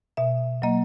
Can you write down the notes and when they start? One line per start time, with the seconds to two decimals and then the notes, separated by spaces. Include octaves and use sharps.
0.17 B2 E5
0.62 F#3 A#3 D#5